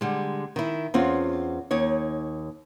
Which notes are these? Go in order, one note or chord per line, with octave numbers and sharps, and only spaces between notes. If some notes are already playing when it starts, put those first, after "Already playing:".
D3 G3 G#3
D#3 E4
E2 C4 C#4 F4
D#2 D#4 C#5